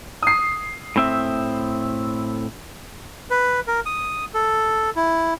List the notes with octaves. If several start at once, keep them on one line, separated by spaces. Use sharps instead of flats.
D#6 C7
A2 C4 E5
B4
A#4
D#6
A4
E4